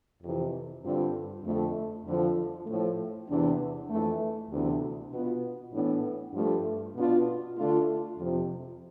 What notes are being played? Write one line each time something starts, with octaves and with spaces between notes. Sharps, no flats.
F2 C3 E3
G2 D3 G3 C4 F4
F2 D3 A3
F2 D3 F3
A2 F3 A3
E2 C3 E3 B3 D4
F2 E3 A3
D2 C3 E3 B3 D4
B2 B3 F4
A2 E3 B3 D4
G2 F3 A3
B2 B3 D4 F4
D3 A3 D4 F4
F2 C3 F3